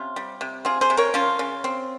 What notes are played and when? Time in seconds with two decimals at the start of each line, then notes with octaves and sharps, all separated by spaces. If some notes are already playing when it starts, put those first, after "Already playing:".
Already playing: C3 C#4 F4
0.16 G3
0.41 C3
0.65 C4 F4 G#4
0.81 G#4 C5
0.90 C3
0.97 A#4 C#5
1.14 F3 C#4 F4
1.39 C#3
1.64 C4